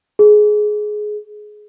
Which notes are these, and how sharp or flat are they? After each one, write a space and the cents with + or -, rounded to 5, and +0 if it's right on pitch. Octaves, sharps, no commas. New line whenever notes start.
G#4 +20